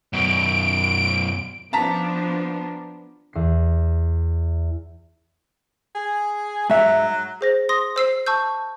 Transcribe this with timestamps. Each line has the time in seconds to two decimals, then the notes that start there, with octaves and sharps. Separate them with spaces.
0.13 F#2 B2 D7
1.73 F3 B3 D4 A5 A#5 B6
3.33 E2 C7
5.95 G#4
6.70 G#2 F#3 E5
7.41 G#4 C5 A#6
7.69 C6 D#6 A#6
7.96 C5 E6 C7
8.26 A5 C#6 E6 G6